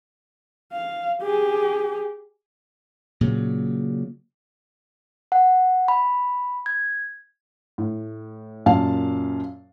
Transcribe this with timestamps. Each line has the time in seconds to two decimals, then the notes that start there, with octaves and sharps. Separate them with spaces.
0.73 F5
1.22 G4 G#4
3.21 A#2 C#3 F#3
5.32 F#5
5.88 B5
6.66 G#6
7.78 A2
8.66 F#2 A#2 F5 A5